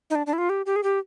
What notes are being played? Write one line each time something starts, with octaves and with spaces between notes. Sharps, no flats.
D#4
D4
D4
E4
F4
G4
G4
G#4
G4